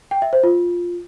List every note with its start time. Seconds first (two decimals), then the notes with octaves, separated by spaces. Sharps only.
0.11 G5
0.22 E5
0.33 C5
0.43 F4